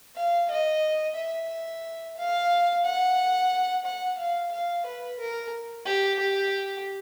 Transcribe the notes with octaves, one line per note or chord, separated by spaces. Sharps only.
F5
D#5
E5
F5
F#5
F#5
F5
F5
B4
A#4
G4
G4